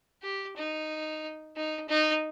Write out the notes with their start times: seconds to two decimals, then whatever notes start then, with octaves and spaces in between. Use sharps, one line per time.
0.22 G4
0.56 D#4
1.56 D#4
1.88 D#4